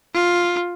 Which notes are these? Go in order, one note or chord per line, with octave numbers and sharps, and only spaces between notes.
F4